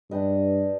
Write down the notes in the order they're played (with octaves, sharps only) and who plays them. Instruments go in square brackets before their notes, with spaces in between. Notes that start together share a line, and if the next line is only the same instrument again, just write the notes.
[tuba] G2 [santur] D4 G4 B4 D#5